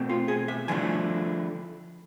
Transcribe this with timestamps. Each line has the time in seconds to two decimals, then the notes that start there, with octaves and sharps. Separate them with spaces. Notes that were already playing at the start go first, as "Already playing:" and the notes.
Already playing: B2 A3 C4
0.09 F4
0.28 G#4
0.48 E5
0.68 D3 F3 A3 E4 G#5